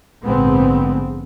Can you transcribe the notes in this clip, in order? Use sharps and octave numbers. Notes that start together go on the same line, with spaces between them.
A#1 G#2 D3 G#3 B3 C4